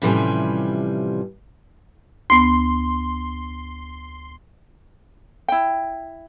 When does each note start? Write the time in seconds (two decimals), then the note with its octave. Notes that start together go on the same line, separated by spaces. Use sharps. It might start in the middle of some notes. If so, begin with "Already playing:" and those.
0.02 A2 C3 E3 F3 G3 C#4
2.30 D2 B3 C6
5.48 E4 G5